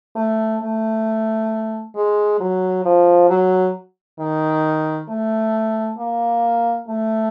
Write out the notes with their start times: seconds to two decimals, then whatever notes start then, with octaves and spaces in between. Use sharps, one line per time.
0.16 A3
0.62 A3
1.95 G#3
2.40 F#3
2.85 F3
3.29 F#3
4.19 D#3
5.09 A3
5.98 A#3
6.88 A3